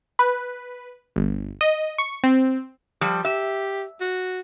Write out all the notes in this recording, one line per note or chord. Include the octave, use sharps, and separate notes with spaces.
B4
G1
D#5
C#6
C4
F3 G3
G4 E5
F#4